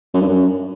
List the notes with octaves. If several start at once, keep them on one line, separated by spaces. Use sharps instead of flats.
F#2
G2
F#2